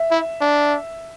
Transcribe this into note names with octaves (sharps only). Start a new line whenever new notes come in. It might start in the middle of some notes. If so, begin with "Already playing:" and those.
Already playing: E5
E4
D4